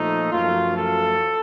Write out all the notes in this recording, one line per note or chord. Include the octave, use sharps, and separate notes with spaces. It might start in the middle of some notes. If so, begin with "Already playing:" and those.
Already playing: A#2 F3 A3 D#4
F#2 F3 A3 F4
A4